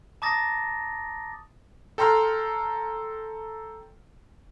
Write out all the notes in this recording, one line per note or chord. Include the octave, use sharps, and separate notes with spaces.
A5 A#5 D6 D#6 A6 A#6
A4 G5 A#5 C6 F6